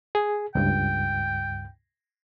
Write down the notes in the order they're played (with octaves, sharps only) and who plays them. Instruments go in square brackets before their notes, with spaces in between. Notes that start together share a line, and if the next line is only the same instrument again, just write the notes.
[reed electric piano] G#4
[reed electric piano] C#2 G2 [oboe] G5